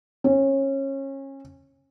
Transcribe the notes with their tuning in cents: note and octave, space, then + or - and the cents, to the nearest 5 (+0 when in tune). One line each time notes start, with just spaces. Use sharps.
C#4 -25